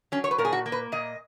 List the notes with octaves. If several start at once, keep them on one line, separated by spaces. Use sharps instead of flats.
F#3 C#4
C#5
B4
A#2 A#4
G#4
F#4
A#3
B4
A#2 D#5